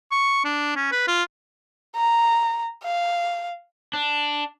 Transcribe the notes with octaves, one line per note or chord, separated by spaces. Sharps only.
C#6
D4
C#4
B4
F4
A#5
F5
D4